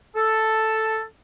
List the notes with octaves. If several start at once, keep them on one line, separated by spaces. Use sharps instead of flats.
A4